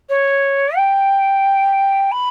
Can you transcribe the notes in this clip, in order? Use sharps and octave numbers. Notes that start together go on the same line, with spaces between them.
C#5
G5
B5